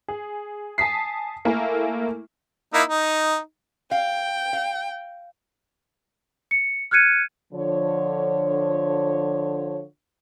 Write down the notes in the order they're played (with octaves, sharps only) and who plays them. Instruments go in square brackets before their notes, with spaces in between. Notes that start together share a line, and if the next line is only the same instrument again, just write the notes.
[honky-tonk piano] G#4
G#5 A5 D#6 B6 C7
A3 A#3 E4 A#4 G#5
[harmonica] A#3 D#4 E4
D#4
[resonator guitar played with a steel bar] F5 [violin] G5
[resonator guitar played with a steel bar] F5
[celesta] C#7
F6 F#6 G#6 C#7 D#7
[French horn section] D3 F3 C#5